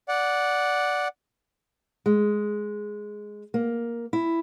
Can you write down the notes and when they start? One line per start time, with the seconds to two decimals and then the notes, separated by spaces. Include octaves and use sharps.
0.09 D5 F#5
2.06 G#3
3.54 A#3
4.13 E4